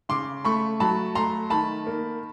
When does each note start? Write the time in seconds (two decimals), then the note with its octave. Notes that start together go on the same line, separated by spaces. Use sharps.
0.09 C#3 C6 D6
0.45 A3 B5 C#6
0.80 F#3 A5 B5
1.15 A3 A#5 C6
1.50 D#3 A5 B5
1.87 A#3